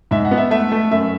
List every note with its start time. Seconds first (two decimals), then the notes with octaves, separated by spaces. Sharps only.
0.11 G#2 E5
0.25 F#5
0.31 B3
0.37 E5
0.51 A3 E5
0.72 A3
0.91 F#2 E5